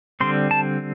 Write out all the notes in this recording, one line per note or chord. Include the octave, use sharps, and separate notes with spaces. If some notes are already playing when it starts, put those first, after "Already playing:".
D3 G3 C4 C6
A5